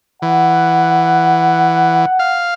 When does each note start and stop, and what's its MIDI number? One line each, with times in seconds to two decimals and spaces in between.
0.22 2.06 52
0.22 2.47 78
2.19 2.54 77